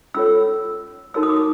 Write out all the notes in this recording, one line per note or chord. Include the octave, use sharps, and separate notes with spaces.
C#4 F4 A4 C#5 E6
D#4 F#4 A#4 C#5 E6
D#6
D6
D#6